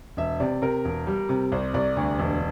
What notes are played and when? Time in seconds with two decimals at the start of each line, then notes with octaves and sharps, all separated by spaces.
0.17 E1 E5
0.40 C3 D5
0.62 C3 A#4
0.85 E1
1.07 G3
1.29 C3
1.52 C2 C5
1.74 C2 D5
1.97 D2
2.19 E1